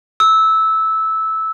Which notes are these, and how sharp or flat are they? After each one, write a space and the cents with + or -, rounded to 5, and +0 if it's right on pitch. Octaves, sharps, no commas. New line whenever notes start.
E6 -15